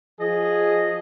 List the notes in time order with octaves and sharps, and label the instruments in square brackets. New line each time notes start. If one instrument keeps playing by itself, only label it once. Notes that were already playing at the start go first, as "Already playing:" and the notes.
[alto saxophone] F3 [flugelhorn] G#4 [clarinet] D#5